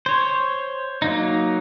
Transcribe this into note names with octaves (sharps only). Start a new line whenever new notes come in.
C5 C#5
F#3 A#3 D#4